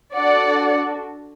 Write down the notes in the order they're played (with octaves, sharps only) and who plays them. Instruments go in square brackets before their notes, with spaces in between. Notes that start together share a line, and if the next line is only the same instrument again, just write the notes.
[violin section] D4 F#4 A4 D5 F#5